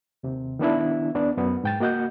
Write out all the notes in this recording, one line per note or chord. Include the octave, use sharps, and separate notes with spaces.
D#2 C3
D#3 B3 D4 E4
D#2 B3 D4 D5
F#2 B3
G#2 G5 A6
A#3 F#4 D#5 F#5 G6